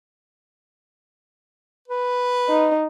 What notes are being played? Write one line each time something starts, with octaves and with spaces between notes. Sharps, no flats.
B4
D#4